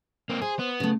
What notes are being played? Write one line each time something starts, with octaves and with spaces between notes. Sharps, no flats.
A#3 C4
G#4 C5
B3
C#3 A3